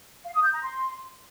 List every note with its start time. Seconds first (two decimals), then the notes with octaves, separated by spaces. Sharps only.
0.24 F5
0.34 D#6
0.43 G6
0.53 A#5
0.62 C6